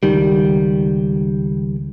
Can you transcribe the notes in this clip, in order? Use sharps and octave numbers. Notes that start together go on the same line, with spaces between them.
C#2 D#3 G3